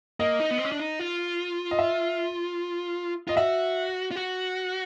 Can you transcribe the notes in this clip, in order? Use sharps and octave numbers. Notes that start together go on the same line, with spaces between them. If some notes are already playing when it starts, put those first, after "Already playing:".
A#3 D#5
D#4
B3
C4
C#4
D4
D#4
F4
D#5
E5
F4 D#5
F#4 E5
F4
F#4